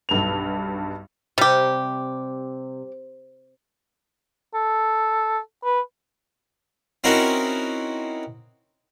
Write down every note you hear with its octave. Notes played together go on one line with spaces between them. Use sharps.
B1 G2 F7
C3 G3 G4
A4
B4
C4 C#4 D#4 E4 F#4 A#4